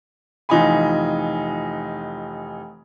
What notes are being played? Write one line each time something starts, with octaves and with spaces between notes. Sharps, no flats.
F1 E3 D#4 F4 G#5 B5